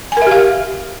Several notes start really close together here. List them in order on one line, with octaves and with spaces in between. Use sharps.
G#5 A#4 E5 G4 F5